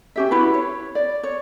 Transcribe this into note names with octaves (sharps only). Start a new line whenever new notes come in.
C#4 G4 E5
E4 F#4 B4
C#5
D5
C#5